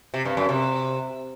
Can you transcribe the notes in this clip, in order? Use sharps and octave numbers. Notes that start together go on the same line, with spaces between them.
C3
G2
F#2
C3